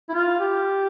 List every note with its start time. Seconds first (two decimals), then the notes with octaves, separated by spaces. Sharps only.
0.09 E4
0.14 F4
0.39 G4